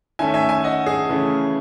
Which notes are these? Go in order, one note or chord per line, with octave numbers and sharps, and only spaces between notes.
D#3 A3 C#4 E5 G#5
E5 G#5
E5 G#5
D#5 F#5
G#4
C#3 E3 A3 C#4